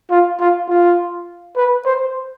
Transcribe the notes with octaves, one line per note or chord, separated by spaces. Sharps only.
F4
F4
F4
B4
C5